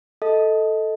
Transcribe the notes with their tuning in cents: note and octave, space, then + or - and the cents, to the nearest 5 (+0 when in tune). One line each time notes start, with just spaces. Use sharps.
A4 +0 D#5 +20